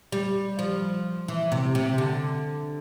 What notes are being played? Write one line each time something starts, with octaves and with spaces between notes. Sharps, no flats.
G3
F3
E3
C3
C3
D3